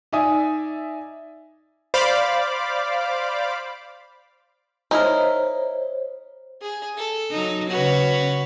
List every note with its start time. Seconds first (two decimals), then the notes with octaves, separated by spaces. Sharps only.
0.13 D#4 D5 E5 G#5 D#6
1.94 C5 D5 F5 B5 D6
4.91 D#4 E4 A#4 C5 C#5
6.62 G#4
6.97 A4
7.31 F#3 D#4
7.70 C#3 F#4 B4 C#5